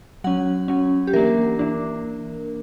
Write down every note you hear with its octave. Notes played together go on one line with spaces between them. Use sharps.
F#3 C#4 F#5
F#3 C#4
G4
E3 A#3 D4 A#4
E3 A#3 D4